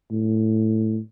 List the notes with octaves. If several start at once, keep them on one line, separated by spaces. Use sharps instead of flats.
A2